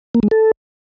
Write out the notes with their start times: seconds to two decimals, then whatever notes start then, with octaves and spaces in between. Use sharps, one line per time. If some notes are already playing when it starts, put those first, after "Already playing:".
0.15 A#3
0.23 G#3
0.31 A4